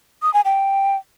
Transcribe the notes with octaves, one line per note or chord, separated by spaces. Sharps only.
D#6
G#5
G5